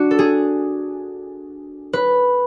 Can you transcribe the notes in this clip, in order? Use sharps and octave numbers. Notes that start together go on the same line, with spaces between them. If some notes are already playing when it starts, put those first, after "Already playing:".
Already playing: D4 F#4
A4
G#4
B4